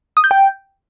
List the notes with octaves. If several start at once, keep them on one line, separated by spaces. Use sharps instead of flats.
D#6
G6
G5